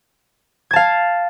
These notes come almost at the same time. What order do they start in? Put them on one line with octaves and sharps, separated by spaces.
G#6 A5 F5